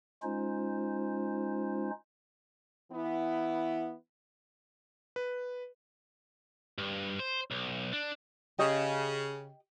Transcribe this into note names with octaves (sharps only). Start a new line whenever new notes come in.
G#3 C#4 D#4 F4 C5
E3 B3 E4
B4
G2
C5
B1
D4
C#3 G4 D#5